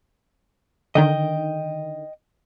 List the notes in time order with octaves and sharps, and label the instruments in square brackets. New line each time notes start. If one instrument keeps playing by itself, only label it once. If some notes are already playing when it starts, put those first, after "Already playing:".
[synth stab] D3 D#3 [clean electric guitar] D#5 G5